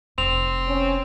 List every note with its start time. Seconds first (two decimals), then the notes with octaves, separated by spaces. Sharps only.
0.18 F1 C4 F7
0.68 C#4